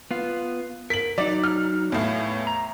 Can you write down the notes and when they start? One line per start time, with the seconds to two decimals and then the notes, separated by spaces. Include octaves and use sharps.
0.11 B3 F4
0.90 A#4 B6 F#7
1.18 F#3 D#4 D5
1.44 F6
1.92 E2 A2 C#5 F5
2.47 A#5